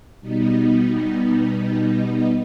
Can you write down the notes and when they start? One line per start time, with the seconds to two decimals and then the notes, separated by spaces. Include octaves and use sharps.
0.21 B2 G3 B3 D#4